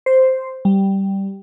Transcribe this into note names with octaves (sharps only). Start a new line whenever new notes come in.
C5
G3